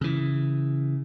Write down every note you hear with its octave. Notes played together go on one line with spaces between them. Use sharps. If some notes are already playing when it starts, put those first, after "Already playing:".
C#3 E3